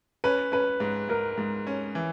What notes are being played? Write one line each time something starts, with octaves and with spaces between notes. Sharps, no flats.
C#4 B4
C#4 B4
G#2
G#2 A#4
G#2
C#4
E3